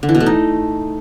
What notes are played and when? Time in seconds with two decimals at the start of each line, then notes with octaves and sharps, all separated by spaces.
0.03 D3
0.09 E3
0.15 B2
0.20 A3
0.26 D#4